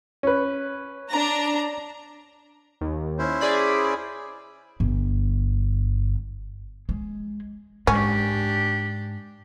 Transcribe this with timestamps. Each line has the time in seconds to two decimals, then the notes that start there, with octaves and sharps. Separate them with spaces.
0.23 C#4 B4
1.08 D4 A#5
2.81 D#2
3.19 C#4 E4 C5
3.41 G#4 D5 B5
4.80 G1
6.89 G#3
7.87 G#2 C#4 D4 G4